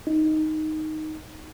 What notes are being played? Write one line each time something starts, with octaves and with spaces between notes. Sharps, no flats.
D#4